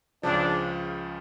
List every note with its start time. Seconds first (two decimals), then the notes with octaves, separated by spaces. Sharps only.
0.23 C#2 C#3 F3 D4